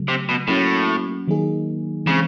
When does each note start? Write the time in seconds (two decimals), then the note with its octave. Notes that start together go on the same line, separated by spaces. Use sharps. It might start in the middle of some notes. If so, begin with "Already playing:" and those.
Already playing: C#3 F#3 A3
0.08 C3
0.29 B2
0.48 A2 F#3 A#3 C#4 F#4
1.28 D#3 F#3 A#3 D#4 G#4
2.06 C#3 E3 G#3 C4